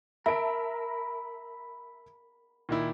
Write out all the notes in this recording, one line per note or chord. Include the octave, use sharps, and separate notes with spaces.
A#4 E5 A5 B5 D7
A#2 D#3 E4